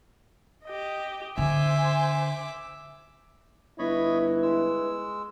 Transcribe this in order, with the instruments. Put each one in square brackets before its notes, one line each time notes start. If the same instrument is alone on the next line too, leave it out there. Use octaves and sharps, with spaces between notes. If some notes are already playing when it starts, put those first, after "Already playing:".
[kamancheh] G4 D#5
[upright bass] D3 [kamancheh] C5 G#5 [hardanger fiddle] E5 D6
[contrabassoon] G1 [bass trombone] E4 [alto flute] B4 [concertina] C#5 D#5 B5
[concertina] G#3 E6